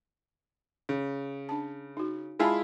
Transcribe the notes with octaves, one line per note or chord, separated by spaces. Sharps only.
C#3
D4 A5
D#4 F#4
G#3 E4 F4 G#5 A5 B5